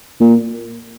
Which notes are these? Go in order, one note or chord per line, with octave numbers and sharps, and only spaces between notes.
A#2